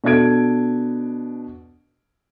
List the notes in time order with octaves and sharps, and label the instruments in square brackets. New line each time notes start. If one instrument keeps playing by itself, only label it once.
[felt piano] B2 D4 A4 G#6 D7